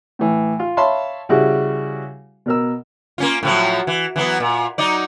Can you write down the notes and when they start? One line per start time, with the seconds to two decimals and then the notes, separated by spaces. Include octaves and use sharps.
0.19 A2 E3
0.59 F4
0.77 C#5 E5 F5 A5 B5 C6
1.29 C#3 G3 E4 F#4 G4
2.46 B2 A#4 E6
3.18 A#3 C#4 F4
3.43 A2 F3 F#3
3.87 E3
4.16 E3 F#3 B3
4.40 A#2
4.78 F#3 D#4 D5